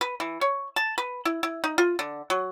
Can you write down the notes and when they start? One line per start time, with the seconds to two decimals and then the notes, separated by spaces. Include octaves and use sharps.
0.01 B4
0.20 E3
0.41 C#5
0.76 A5
0.98 B4
1.25 E4
1.43 E4
1.64 D#4
1.78 F4
1.99 D3
2.30 F#3